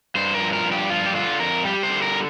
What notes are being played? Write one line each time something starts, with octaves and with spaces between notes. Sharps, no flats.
G2 C5
A#4
F3
A#4
G2
G4
F3 F4
G4
D3 F4
F2 A#4
G3 G4
C5
D3
A#4